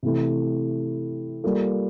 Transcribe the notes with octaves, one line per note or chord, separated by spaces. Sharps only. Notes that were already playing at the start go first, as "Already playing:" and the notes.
C3 E3 A3 E4
G3 A#3 F4 A4